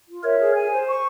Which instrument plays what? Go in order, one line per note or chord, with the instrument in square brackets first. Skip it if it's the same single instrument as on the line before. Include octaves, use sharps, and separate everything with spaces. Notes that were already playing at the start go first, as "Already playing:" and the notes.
[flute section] F4
[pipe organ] A#4 C#5 [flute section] E5
[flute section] G#4
G#5
C5
C#6